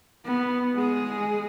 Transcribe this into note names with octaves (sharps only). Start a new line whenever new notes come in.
B3
G#3 G#4